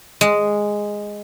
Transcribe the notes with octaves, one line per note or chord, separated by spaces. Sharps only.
G#3